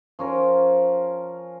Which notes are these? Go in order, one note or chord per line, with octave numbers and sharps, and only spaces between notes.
F3 C#4 A#4